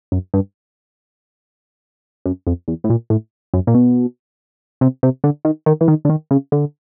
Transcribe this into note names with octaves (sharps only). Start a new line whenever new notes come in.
F#2
G2
F#2
F2
E2
A2
A#2
A2
F#2
A#2
B2
C3
C3
D3
D#3
D#3
E3
D#3
D3
D#3
C#3
D3